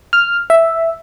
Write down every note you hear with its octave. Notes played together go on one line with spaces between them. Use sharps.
F6
E5